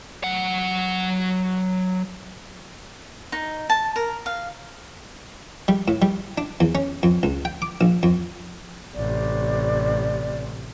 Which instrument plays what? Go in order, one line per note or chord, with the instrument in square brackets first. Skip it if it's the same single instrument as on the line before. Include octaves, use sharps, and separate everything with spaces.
[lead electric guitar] F#3 F#5
[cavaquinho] D#4
A5
A#4
F5
[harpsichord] G3
A2
G3
D4
E2
C#4
F2
C#2
G5
D6
A#1
F2
[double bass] A1 C3 [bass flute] D5